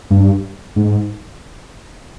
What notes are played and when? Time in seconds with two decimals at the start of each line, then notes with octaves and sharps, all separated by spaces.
0.11 G2
0.76 G#2